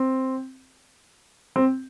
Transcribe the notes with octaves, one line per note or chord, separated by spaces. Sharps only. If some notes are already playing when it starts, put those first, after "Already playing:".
Already playing: C4
C4